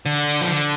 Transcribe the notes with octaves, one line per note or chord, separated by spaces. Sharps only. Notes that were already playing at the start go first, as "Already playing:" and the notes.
D3
F3
D3